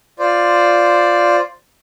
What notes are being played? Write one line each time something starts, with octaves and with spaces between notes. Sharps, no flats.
F4 C5 D5